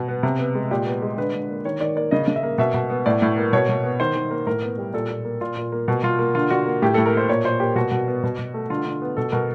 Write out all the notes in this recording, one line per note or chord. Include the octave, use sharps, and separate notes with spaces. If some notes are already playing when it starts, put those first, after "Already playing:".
Already playing: B2
B3
C3
B3
G#3
A#2 G4
B3
G#3
D3 B4
D3
A#3
D#3 C#5
D#3 D5
A#3 D5
C#3 D#5
C#3
E5
A#3
B2 E5
B2
B3
A2 D5
A2
A#3
B2 C#5
B2
B3
D#3 C5
D#3
A#3
A2 A#4
B3
G3
A#2 A4
A#2
A#3
A#2 F4
A#2
A#3
B2
B2 F4
A#3
D3 F4
D3 F#4
A#3
A2 G4
A2 A4
A#4
A#3 C5
A#2 C#5
A#2 C5
A#3 G4
B2 F#4
B2
B3
B2
B2
A3
D3 F4
D3
B3
B2 A4
B2 A#4